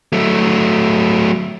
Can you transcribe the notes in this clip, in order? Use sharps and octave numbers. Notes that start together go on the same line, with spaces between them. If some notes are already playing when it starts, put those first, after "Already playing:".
F#3 A3